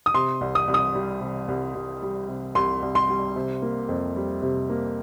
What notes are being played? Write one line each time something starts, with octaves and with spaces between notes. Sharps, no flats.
D#6
C3 C6
C2
D#6
C2
D#6
G3
C3
C2
C2
G3
C3
C2 C6
C2
C6
G3
C3
A#3
F2
G3
C3
A#3